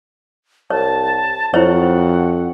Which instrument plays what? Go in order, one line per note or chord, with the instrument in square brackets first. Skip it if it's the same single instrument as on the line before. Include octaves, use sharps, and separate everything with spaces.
[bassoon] C2 [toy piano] C#5 [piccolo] A5
[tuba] F2 [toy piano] E4 C5 C#5 [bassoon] F#4 [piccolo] F#5